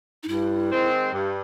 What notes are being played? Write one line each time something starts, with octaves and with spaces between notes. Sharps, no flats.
D#4
G2 E4
D#3 G#3 C4
G2